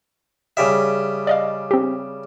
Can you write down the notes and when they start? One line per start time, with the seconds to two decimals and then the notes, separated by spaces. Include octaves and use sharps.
0.57 C#3 G3 E5
1.27 D5 D#5 F5
1.71 C4 G4